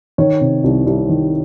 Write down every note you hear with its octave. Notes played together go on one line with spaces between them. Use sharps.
D#3 C#5
C3
C2
C2
D#3